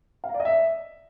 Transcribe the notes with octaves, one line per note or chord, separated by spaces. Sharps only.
F5
A#5
D5
D#5
E5